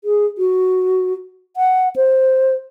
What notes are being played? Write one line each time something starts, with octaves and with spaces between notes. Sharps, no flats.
G#4
F#4
F#5
C5